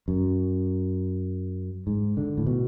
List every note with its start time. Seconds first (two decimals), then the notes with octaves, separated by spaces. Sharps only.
0.08 F#2
1.87 G#2
2.17 D3
2.37 A2
2.46 B2